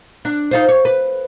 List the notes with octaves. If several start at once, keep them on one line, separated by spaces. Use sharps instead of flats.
D4
D#4 F4 C5
C#5
B4